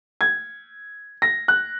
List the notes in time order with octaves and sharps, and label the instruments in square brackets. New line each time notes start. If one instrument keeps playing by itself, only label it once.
[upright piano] G#6
A#6
F#6